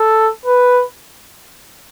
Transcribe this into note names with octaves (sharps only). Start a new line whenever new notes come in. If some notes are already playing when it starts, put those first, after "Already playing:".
Already playing: A4
B4